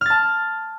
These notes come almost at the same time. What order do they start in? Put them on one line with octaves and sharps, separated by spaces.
F6 A6 A5